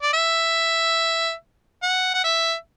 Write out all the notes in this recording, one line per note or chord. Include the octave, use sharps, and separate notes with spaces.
D5
E5
F#5
F#5
E5